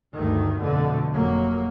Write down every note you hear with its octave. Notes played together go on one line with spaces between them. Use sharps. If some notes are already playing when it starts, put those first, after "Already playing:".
D2 G2 D#3 A3
F2 B2 D3 A3
F1 F#3 A#3